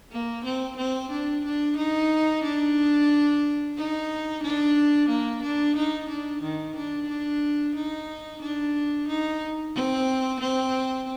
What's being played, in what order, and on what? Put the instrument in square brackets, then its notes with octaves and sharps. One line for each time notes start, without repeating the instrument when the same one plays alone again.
[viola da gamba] A#3
C4
C4
D4
D4
D#4
D4
D#4
D4
A#3
D4
D#4
D4
D#3
D4
D4
D#4
D4
D#4
C4
C4